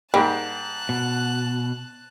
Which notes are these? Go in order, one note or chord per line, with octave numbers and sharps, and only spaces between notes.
G#2 G3 A#3 G4 A5 F#6
B2